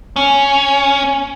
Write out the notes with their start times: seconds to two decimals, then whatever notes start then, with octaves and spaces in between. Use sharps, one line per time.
0.16 C#4